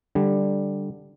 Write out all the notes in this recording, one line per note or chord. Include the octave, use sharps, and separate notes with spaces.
D3 G3